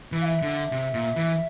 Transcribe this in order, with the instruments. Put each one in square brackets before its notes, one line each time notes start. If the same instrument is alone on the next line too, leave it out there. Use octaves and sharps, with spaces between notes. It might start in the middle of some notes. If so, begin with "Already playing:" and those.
[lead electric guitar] E3
[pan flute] F5
E5
[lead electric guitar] D3
C3
A#2
E3